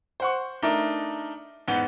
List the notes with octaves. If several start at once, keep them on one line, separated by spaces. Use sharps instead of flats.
C5 F#5 C#6
A3 D4 D#4 A#4
E2 G#2 B3 F#5 G7